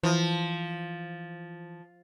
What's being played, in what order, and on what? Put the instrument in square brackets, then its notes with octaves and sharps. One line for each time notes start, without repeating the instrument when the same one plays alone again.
[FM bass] E3 [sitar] F3